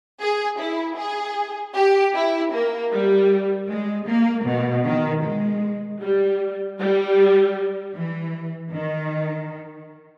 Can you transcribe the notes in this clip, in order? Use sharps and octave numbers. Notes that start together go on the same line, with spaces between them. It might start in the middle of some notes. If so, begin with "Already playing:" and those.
G#4
E4
G#4
G4
E4
A#3
G3
G#3
A#3
B2
D#3
G#3
G3
G3
E3
D#3